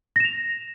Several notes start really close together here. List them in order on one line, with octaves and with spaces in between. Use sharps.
A#6 E7 F7